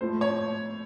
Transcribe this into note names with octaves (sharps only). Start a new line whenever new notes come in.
A2 F3 A3 C5
C#5